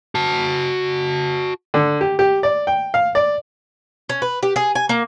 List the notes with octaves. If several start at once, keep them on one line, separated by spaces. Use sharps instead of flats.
F#4 A5
D3
G4
G4
D5
G5
F5
D5
C#4
B4
G4
G#4
G#5
A#3